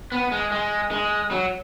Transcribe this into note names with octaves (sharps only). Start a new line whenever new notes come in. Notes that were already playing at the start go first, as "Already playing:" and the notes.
B3
G#3
G#3
G#3
F#3